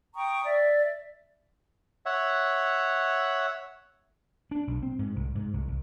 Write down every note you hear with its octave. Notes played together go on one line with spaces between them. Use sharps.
G5 A#5 C#6 D#6
D5 E5
C#5 E5 F#5
D4
B1
C4
G#2
C2
G#2
C2
C2